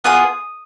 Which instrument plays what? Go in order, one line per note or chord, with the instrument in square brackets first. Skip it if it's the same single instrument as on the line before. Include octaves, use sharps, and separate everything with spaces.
[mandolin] B3 F4 G#4 D#6